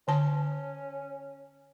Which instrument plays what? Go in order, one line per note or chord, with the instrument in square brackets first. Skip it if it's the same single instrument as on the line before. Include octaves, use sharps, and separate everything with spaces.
[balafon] D3 A5 [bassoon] C#4